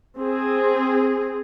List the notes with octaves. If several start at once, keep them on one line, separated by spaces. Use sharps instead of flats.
C4 G#4